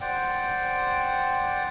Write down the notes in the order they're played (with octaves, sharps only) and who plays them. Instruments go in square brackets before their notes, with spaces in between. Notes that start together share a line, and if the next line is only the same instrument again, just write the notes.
[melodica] C5 D5 F#5 G5